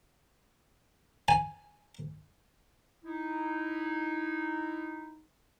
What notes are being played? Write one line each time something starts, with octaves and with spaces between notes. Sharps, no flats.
G#5
D#4 E4